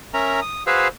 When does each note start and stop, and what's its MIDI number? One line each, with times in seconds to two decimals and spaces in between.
0.14 0.40 61
0.14 0.40 70
0.14 0.40 76
0.14 0.40 82
0.42 0.63 87
0.67 0.88 66
0.67 0.88 68
0.67 0.88 71
0.67 0.88 72
0.67 0.88 77
0.67 0.88 88